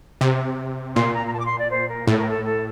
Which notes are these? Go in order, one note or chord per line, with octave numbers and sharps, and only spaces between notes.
C3
A#2 C6
A#5
A#5
A5
D6
C6
D5
C5
A#4
A2 A4
A#4
A4
A4